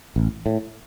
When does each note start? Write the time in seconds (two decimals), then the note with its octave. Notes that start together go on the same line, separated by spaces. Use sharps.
0.16 A1
0.46 A2